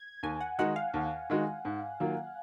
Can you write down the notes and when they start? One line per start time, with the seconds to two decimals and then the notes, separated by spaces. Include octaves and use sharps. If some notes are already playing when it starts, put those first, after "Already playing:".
Already playing: G#6
0.23 D#2 G#5
0.41 F#5
0.59 D#3 G#3 D#4 F#4 F#5
0.76 F5
0.94 D#2
1.30 D#3 G#3 D#4 F#4
1.65 G#2
2.00 D#3 F#3 A#3 F4